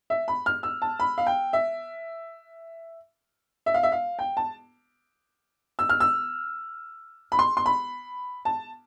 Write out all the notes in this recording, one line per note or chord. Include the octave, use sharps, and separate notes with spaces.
E5
B5
F6
E6
A5
B5
F5
G5
E5
E5
F5
E5
F5
G5
A5
E6
F6
E6
B5
C6
C6
B5
A5